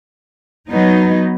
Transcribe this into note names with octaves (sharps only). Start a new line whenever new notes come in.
F#3 B3 D#4